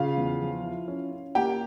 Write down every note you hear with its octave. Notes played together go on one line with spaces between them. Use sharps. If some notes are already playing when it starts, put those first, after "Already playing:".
Already playing: C#3 F4 F5
E2
F3
E4
C#4
C#4
A#3 G4 G5